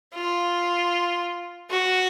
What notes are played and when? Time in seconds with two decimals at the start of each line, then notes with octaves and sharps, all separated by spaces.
0.15 F4
1.71 F#4